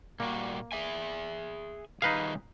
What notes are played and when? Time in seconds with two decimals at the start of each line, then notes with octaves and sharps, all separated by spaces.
0.20 A#2 G3 A#3 F#4
0.72 G#4 E5 G#5
2.02 D#3 G3 D#4 G#4 B4 F5